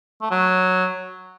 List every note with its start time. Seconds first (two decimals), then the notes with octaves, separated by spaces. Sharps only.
0.22 A3
0.31 F#3